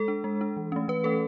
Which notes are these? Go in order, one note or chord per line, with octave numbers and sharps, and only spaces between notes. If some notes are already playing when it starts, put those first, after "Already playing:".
Already playing: G#3 A4
D4
G#3
D4
E3
A3 C#4
E3 B4
A3 C#4 A4